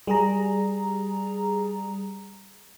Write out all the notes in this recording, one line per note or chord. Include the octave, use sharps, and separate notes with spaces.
G3 G#4 A#5